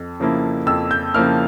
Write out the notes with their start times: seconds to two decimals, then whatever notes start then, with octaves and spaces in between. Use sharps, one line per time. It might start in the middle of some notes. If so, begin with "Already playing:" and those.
Already playing: F2
0.20 C#3 F3 A#3 E4
0.67 F2 E6
0.91 G6
1.14 C#3 F3 A#3 E4 F6